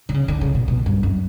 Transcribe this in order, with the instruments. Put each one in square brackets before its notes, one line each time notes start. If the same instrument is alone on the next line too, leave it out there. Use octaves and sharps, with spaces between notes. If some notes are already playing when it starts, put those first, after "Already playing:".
[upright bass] D3
C#3
D3
C#3
B2
B2
G2
F#2